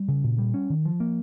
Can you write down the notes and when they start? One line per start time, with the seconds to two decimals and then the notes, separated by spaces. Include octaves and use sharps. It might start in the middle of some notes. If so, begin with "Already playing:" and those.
Already playing: G3
0.08 C#3
0.24 A#2
0.38 G3
0.54 C#4
0.70 D#3
0.85 F3
1.00 A#3